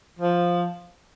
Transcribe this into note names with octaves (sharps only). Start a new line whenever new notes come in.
F3